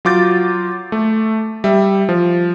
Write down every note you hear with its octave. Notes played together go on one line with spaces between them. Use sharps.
F#3 F4 D6 G6 A6
A3
G3 E5
F3